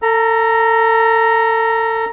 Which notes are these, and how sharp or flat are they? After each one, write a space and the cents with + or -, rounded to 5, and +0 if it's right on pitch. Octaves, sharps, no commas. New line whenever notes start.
A4 +30 A#5 +0